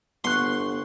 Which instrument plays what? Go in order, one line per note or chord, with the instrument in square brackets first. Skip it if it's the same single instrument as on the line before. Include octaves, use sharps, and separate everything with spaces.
[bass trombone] G1 [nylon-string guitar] B3 F#5 [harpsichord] C6 [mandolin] C#6 F#6